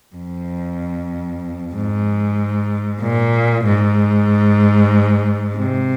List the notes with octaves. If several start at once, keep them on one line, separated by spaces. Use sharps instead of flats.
F2
G#2
A#2
G#2
C3